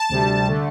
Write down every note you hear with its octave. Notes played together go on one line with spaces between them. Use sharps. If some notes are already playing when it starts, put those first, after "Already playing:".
Already playing: A5
D2 C3 G3
D3 A3